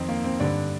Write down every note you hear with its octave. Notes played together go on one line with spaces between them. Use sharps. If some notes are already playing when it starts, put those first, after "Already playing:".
Already playing: F2 D#3 C4 D#4
A#3
C4
G2 D3 D4